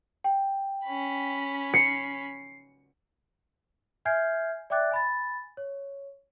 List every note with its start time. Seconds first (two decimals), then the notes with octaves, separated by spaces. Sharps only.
0.24 G5
0.85 C#4 B5
1.74 C7 C#7
4.05 E5 G#5 F6 G6 G#6 C7
4.70 D5 E5 G5 D6 F#6 A6
4.91 G#5 B5 A6
5.57 C#5